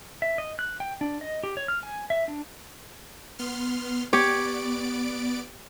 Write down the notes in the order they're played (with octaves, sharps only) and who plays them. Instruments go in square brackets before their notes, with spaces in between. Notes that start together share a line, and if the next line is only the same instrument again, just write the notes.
[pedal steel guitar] E5
D#5
F#6
G5
D4
D#5
G4
C#5
F6
G#5
E5
D4
[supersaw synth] B3 C6 F6
[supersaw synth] B3 D5 D7 [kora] G4 C#5